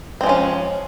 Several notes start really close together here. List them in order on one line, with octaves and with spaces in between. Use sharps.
C4 G#3 F3 C#4